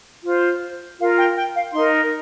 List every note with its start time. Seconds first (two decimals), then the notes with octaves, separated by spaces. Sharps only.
0.23 F4 C5
0.99 F4 A#4 F5
1.18 G5
1.36 G5
1.55 F5
1.73 D#4 A#4 C6